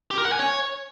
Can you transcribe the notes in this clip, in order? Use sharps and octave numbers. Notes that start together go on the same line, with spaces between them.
G4
A#4
F#5
G#5
C#5